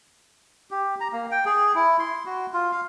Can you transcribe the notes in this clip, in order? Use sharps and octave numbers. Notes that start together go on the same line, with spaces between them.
G4
A#5
A#3
G5
G#4
E4
C6
F#4
F4
F5